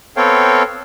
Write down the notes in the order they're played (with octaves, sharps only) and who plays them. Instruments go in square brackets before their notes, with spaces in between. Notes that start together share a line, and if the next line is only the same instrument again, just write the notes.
[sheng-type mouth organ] B3 C4 A4 C#5 F5 G5